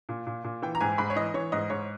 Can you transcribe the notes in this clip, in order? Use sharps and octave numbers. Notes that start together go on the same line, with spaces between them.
A#2
A#2
A#2
E3 G5
A#5
G#2 G#5
G#2 B5
C#5
E3 D#5
E3 C#5
G#2 D#5
G#2 C#5